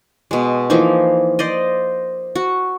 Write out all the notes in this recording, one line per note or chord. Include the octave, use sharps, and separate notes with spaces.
B2 G#3
E3 F3 A#3 D#4
C5 D5 D#5
F#4